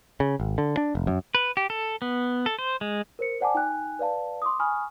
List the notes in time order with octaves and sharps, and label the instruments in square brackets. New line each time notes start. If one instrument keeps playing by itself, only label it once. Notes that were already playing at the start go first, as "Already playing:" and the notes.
[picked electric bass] C#3
G#1
D3
D4
F1
F#2
[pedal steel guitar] B4
G4
A4
B3
A4
C5
G#3
[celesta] A#4 C5 C#7
C5 D5 F#5 G#5 A5 D6
D#4 G5 G#5 F#6
B4 D5 F5 A5
C6 D6 D#6
G#5 B5 C#6 D#6 F6